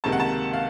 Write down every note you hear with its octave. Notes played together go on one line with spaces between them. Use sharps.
C#2 C3 D#3 A#3 A5
F#5
A5
F5